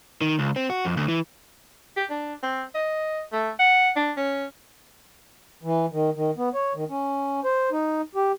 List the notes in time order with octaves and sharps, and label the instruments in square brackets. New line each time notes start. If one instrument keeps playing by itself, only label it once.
[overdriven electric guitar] D#3
C#2
C4
F#4
F2
D2
E3
[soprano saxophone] G4
D4
C4
D#5
A3
F#5
D4
C#4
[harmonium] E3
D#3
D#3
B3
C#5
D#3
C#4
C5
D#4
G4